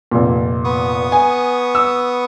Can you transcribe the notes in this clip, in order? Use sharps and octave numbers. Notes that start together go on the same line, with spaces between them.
F1 A#2
B3 C#6 D#6
G#5
E6